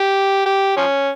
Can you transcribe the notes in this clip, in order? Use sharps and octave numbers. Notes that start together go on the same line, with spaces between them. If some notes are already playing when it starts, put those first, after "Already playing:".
Already playing: G4
G4
F3 C#4